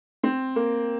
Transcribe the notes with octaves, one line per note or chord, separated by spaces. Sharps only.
C4
A#3